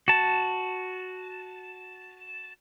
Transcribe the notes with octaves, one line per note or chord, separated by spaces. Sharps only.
F#4 A5